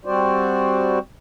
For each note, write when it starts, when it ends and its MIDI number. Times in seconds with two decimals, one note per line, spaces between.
0.05 0.99 55
0.05 0.99 60
0.05 0.99 66
0.05 0.99 72
0.05 0.99 74